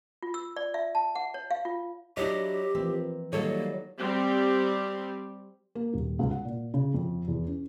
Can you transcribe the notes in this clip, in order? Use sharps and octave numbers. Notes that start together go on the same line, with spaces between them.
F4
E6
D5
E5
A5
F#5
C#5
F5
F4
F#3 D4 E4 G4 D#5
E3 F3 A#3 C4
D#3 F#3 G3 A#3 A4 C#5 D#5
G3 C4 G4
A#3
D#1
C#2
F#5
A#2
C#3
F2
E2
C#4